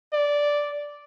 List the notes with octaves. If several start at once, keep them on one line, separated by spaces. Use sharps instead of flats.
D5